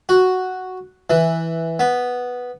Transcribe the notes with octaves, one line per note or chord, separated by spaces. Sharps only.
F#4
E3
B3